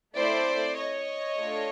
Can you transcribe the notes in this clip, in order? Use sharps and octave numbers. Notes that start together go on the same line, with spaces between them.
A3 C4 E4 A4 C5 D5
C#5 D#5
A3 D4 F4 A4